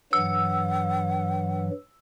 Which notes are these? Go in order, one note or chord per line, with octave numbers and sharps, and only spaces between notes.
G2 E3 F#3 F#5 E6